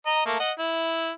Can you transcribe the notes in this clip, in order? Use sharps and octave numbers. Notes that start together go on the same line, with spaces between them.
D#5 A#5
A3 A#3
D#5 F#5
E4